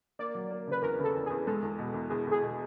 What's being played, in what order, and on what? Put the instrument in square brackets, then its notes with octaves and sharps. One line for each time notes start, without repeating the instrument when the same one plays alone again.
[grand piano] A#3 [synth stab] D5
[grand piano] F#3
A#3
[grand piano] C#3 [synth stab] B4
[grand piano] E2 [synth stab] A#4
[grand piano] C#3 [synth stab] A4
[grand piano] E2
[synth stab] G#4
[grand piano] E2
[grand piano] G#3 [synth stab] A4
[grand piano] E2
B2
E2
[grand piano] E2 [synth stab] G#4
[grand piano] E2 [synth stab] G#4
[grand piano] B2